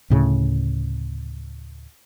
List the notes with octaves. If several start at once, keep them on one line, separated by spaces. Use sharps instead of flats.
D2 A2 C#3